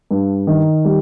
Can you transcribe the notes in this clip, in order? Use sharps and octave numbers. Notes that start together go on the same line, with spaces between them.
G2
D#3
G3